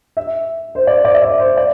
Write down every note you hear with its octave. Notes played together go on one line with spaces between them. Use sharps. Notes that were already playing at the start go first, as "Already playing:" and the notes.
E5
C5
D5
D5
E5
D5
C5
D5